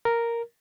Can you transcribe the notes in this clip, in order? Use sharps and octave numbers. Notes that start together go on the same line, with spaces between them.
A#4